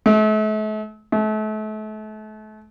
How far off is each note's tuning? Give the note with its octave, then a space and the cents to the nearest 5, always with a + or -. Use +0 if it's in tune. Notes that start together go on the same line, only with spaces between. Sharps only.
A3 -40
A3 -35